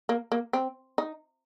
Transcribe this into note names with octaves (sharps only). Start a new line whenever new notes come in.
A#3
A#3
C4
D#4